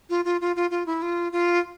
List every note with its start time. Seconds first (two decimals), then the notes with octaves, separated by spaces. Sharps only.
0.10 F4
0.25 F4
0.41 F4
0.56 F4
0.71 F4
0.86 E4
1.02 F4
1.32 F4